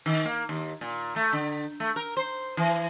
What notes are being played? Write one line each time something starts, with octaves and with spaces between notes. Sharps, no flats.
D#3
A#3
D#2
A#2
A3
D3
A3
A#4
C5
E3